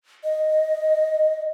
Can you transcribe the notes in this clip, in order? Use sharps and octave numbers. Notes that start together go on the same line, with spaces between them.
D#5